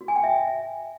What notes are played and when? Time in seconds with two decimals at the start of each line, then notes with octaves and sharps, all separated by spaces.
0.01 F#4
0.08 G#5
0.16 G5
0.23 E5